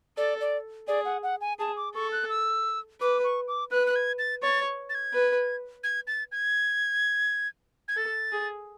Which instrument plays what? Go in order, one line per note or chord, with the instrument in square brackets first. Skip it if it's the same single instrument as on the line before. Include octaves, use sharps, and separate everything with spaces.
[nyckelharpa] A4 [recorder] D5
[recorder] D5
[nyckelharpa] G#4 [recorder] D5
[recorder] F#5
F#5
G#5
[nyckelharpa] G#4 [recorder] A5
[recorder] D6
[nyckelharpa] A4 [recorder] C#6
[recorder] F#6
E6
[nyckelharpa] B4 [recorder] D6
[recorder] C#6
D6
[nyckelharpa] B4 [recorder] F#6
[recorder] F#6
G#6
A6
[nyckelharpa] C#5 [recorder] A6
[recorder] A6
G#6
[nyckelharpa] B4
[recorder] G#6
A6
G#6
G#6
[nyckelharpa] A4 [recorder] A6
[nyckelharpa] G#4